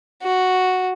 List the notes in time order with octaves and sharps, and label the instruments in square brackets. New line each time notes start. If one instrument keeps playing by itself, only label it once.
[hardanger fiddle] F#4